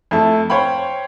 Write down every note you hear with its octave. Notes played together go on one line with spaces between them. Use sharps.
F2 A3 E4 A5
C5 C#5 F5 G5 B5